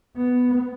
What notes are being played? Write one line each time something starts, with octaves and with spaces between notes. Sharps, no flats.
B3